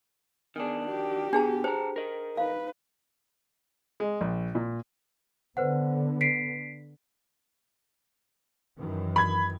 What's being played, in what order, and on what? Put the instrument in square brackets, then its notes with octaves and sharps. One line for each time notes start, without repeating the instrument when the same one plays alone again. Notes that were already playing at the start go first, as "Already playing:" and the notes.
[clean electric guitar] D#3 D4 [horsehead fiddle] B3 G#4
[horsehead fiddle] F#4 G4
[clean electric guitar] B2 [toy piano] D4 G#4 A5
[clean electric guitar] A4 A#5 [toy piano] C5
[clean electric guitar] A#4 D#5
[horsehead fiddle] D#4 B4 [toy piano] F5
[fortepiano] G#3
A#1
A#2
[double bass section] D3 B3 [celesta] B4 C5 F#5
[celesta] B6 C7 D7
[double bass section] F#2 D#3 E3
[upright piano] B5 G#6